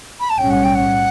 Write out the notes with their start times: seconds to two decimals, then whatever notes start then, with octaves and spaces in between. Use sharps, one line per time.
0.19 B5
0.29 A5
0.37 B1 A2 G3 C#4 G5
0.50 F#5
0.63 G5
0.74 F#5